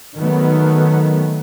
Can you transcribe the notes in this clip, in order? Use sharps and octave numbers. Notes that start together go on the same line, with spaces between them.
D#3 F#3 A3 B3